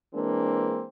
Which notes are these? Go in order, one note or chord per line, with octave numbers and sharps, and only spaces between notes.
E3 G#3 A#3 C4 D4